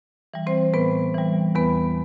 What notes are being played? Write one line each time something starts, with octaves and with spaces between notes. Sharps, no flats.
E3 G3
C4 C5
A2 B3 B4
E3 G3
E2 B3 B4